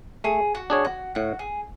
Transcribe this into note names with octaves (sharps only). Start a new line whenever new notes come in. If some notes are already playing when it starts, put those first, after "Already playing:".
A3 G#4
F#4
D4 G#4 C#5
F#4
A2 F#4
G#4